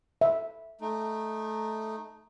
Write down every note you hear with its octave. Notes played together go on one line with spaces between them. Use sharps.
E5
A3 D#4